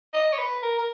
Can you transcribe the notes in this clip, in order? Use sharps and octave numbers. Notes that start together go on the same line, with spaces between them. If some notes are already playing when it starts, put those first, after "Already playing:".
D#5
C#5
B4
A#4
A#4